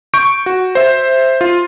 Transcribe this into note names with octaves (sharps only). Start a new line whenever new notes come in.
C#6 G6 D7
F#4
C5 E5
F4